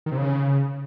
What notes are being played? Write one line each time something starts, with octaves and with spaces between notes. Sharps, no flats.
D#3
C3
C#3